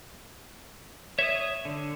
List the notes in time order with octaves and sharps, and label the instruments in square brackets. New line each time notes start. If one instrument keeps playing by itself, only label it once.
[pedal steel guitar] C#5 D#6 [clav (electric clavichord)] E5
[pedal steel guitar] D3